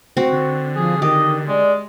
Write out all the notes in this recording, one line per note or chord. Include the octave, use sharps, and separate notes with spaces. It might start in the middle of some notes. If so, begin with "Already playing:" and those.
C4 F#4
D3
F3 G#4
D#3 G4 D#5
G#3 D5